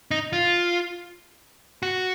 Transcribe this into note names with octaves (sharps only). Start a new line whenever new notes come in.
D#4
F4
F#4